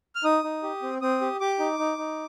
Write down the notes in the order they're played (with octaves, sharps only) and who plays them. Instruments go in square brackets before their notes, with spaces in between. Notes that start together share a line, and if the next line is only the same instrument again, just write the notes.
[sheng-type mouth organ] F6
D#4 D#6
D#4
G4
C4
C4 D#6
G4
G4 D6
D#4
D#4
D#4